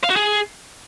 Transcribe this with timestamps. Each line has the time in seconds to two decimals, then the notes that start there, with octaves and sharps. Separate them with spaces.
0.04 F5
0.10 F#4
0.16 G#4